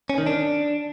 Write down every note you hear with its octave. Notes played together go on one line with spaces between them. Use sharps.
C#4
D#3
D4